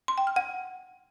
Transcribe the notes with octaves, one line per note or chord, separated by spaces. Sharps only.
C6
G5
F6
F#5